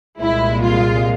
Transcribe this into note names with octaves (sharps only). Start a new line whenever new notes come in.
C2 A#2 G#3 E4
F4